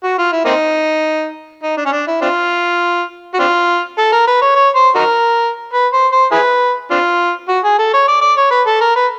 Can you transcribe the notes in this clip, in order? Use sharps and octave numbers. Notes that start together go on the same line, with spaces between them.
F#4
F4
E4
A#3 C4 D#4
D#4
D4
C#4
D4
E4
C4 D4 F4
F#4
C4 D4 F4
A4
A#4
B4
C#5
C#5
C5
D#4 F#4 A#4
B4
C5
C5
E4 G#4 B4
C4 D4 F4
F#4
G#4
A4
C#5
D5
D5
C#5
B4
A4
A#4
B4